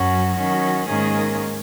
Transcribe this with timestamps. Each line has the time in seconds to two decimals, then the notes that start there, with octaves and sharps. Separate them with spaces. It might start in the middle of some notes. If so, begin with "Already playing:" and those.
Already playing: F#2 F#3 C#4 F#4
0.36 D#3 F#3 C#4 F#4
0.87 G#2 D#3 A#3 C#4 G#4